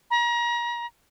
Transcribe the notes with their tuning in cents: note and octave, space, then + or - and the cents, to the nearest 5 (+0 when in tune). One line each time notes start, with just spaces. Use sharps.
A#5 +35